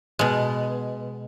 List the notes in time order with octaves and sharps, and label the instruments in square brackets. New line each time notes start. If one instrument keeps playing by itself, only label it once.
[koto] B2 G#3